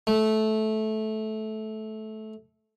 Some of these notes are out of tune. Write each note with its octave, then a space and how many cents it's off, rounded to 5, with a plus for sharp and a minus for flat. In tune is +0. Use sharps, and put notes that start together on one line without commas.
A3 -15